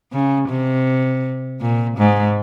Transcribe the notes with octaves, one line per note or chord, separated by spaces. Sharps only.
C#3
C3
A#2
G#2